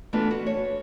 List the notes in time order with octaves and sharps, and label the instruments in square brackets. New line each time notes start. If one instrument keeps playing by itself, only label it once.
[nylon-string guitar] E3 A3 B3 D4 F4 F#4
F#4
C#5